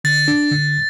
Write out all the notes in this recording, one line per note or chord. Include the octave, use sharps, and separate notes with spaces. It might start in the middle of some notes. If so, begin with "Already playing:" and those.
D3 A6
D4
D3